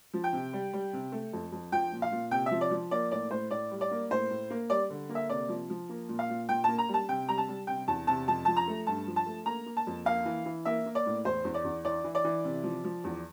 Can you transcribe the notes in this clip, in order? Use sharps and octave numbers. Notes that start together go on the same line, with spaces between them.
F3
G5
C3
G3
G3
C3
A3
F2
F2
F3 G5
A#2
F5
A#2
C3 G5
F3 E5
D5
F3
A#3 D5
A2 D5
A2 C5
A2 D5
G3
D5
A#3
A2 C5
A2
A#3
G3 D5
D3
A#3
E5
C3 D5
F3
F3
A#3
A#2
F5
A#2
A#2 G5
A#3 A5
A#5
G3
A5
C3 G5
G3 A#5
A5
G3
C3 G5
E2 A5
C3 A5
F2 A5
F3 A5
A#5
A3
G2 A5
F3
A5
A3
A#3 A#5
A#3
A5
F2
A#3 F5
E3
E3
A#3 E5
A#3
D5
A2
E2 C5
E2
D5
E2
E3 D5
E3
D5
E3
C3
F3
F3
E2